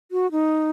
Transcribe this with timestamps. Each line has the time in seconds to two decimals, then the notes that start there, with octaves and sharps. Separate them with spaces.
0.12 F#4
0.32 D#4